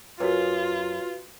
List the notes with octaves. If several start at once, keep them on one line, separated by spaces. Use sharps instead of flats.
F#2 F4 F#4 B4